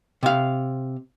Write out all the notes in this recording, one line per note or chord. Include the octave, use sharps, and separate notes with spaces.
C3 F5